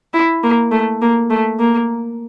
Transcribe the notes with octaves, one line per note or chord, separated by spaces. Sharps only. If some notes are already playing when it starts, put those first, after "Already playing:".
E4
A#3
A3
A#3
A3
A#3